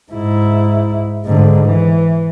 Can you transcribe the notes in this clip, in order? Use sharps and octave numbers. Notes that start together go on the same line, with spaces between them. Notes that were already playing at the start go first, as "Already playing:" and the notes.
G#2 E4
G#2 D3
E3